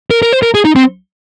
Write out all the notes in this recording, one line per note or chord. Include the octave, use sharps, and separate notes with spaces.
A#4
A#4
C5
A#4
G#4
D#4
C4